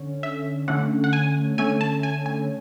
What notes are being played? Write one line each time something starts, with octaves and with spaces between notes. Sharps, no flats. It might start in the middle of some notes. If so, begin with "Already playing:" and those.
Already playing: D3 C#4
E5
D3 A3 C#4 F#5
F#5
G#5
D3 A3 C#4 G#5
A5
G#5
G#5